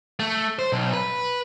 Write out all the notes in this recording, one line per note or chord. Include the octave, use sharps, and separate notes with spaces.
A3
C5
B1
B4